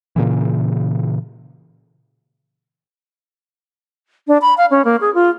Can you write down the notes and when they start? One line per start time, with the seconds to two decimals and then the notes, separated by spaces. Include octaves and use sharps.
0.16 A#2 C#3 E3
4.28 D4
4.42 B5
4.58 F5
4.71 C#4
4.85 A#3
5.01 G#4
5.14 F4